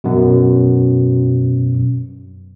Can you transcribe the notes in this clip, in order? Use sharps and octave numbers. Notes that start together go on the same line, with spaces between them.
F#2 B2